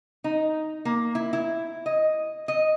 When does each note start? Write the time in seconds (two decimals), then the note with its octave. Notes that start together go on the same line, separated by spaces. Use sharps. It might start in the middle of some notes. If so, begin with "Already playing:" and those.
0.24 D#4
0.85 A#3
1.15 E4
1.33 E4
1.86 D#5
2.48 D#5